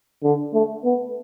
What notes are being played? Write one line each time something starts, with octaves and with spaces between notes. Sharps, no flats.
D3
A3
B3